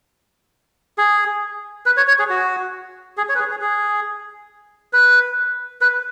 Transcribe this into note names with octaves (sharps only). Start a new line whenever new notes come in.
G#4
B4
C#5
C#5
G#4
F#4
G#4
C#5
B4
G#4
G#4
G#4
B4
B4